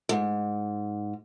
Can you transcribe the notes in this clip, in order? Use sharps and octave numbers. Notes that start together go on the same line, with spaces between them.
G#2